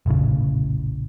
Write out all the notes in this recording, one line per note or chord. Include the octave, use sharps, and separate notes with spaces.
F1 A#1 A2 C#3